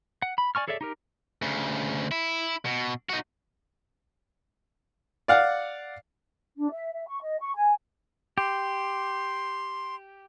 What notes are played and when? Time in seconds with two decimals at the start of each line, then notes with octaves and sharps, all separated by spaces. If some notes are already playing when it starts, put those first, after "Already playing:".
0.22 F#5
0.38 B5
0.55 D5 G#5 C#6 F6
0.68 G#4 A4 C#5 D5 E5
0.81 D#4 G4 A#4
1.42 D2 C#3
2.11 E4
2.65 B2
3.09 D#4 F#4
5.28 D5 F5 F#5
6.58 D4
6.72 E5
6.93 E5
7.08 C#6
7.23 D#5
7.41 C#6
7.55 G#5
8.38 G4 C6